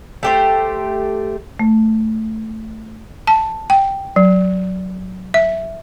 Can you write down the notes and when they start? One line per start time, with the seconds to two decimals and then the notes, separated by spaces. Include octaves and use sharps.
0.23 A3 G4 C5
1.59 A3
3.27 A5
3.70 G5
4.16 F#3
5.34 E5